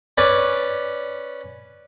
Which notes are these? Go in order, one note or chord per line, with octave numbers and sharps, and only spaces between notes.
C#4 B4 D5